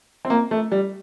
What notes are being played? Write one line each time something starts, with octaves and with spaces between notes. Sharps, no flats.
C4
A#3
A3
G3